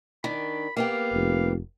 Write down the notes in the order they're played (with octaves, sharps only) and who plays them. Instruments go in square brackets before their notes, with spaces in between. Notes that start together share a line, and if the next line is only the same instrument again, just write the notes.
[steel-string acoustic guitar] D#3 D4 [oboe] B5
[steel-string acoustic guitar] A#3 B3 G4 [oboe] F5
[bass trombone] F1